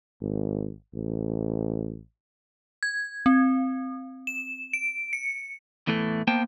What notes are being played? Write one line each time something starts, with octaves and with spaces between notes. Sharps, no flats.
G#1
A1
G#6
C4
E7
D7
C#7
E2 A2 E3 A3
A#3 B3 C5 G5 A5